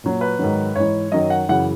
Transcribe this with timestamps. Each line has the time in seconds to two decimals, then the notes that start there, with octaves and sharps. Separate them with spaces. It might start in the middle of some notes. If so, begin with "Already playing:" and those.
0.04 A#2 F#3
0.21 B4
0.39 G#2 D#3 F#3
0.76 G#2 E3 C#5
1.12 F#2 D#3 F#3 D#5
1.30 F#5
1.49 F#2 C#3 E3 F#5